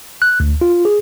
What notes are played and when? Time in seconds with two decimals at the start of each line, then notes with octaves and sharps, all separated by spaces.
0.22 F#6
0.40 D2
0.61 F4
0.85 G#4